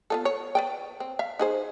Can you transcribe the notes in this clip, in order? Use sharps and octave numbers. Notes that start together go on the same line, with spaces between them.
B3 F4 A4
C#5
B4 D5 G5
C4
E5 F5
D#4 G#4 C5